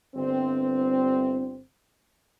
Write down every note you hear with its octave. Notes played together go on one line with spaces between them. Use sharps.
G1 C4